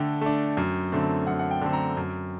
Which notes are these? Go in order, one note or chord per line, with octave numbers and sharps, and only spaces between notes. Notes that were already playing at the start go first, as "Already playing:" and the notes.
Already playing: D3 A3 D4 G5
A3 D4
F#2
D3 A3 C4
F#2 F#5
F#5
G5
D3 A3 C4
A#5
F#2